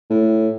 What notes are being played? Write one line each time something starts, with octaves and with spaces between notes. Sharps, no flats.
A2